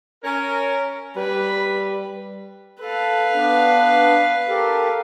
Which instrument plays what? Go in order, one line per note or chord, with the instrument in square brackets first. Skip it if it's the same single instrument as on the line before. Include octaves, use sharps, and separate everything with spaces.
[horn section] C#4 A#4
[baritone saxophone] G3 [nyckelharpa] B4 B5
[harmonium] A4 [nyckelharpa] B4 F5
[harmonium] B3 D4
G4 A4 A#4